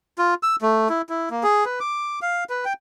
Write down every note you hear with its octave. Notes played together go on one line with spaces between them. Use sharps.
F4
E6
A3
E4
E4
A#3
G#4
B4
D6
F5
B4
G5